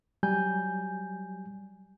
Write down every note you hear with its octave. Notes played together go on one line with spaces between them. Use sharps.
F#3 G3 G#5 G6